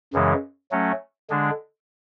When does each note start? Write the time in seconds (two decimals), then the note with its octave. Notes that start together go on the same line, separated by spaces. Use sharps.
0.13 F#2 C#3 E3 G#3
0.71 F#3 A3 C#4
1.30 D3 G#3 D4